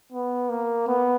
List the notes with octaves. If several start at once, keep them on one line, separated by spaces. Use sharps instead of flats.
B3
A#3
B3